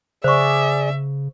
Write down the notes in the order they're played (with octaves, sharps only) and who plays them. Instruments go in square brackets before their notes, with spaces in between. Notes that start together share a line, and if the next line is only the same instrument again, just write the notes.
[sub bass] C#3 [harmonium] G#4 D5 [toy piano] C5 C#6 [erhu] E5